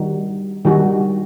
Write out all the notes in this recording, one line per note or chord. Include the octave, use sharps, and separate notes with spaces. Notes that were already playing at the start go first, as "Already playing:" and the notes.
Already playing: D#3 G3 D#4 F#4
D#3 G3 D#4 F#4